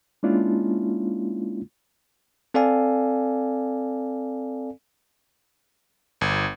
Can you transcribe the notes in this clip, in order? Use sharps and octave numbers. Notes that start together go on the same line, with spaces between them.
G#3 A#3 C#4 D4 E4 F4
C4 A4 D5 F5 G#5
G1